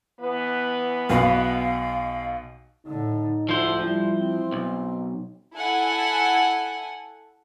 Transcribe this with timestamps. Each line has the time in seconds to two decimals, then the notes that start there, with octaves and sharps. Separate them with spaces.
0.19 E3 B3 B4
1.10 B1 B2 F5
2.86 A2 D3 D#4
3.49 D2 F3 E4 C5
3.82 G3 E4
4.19 C4
4.52 B1
5.55 E4 A4 F#5 G#5